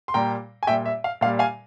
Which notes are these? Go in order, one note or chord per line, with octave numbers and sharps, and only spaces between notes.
C6
A#2 G3 G5 A#5
G#5
A#2 G3 E5 G5
E5
F5
A#2 G3 F5
F5 G#5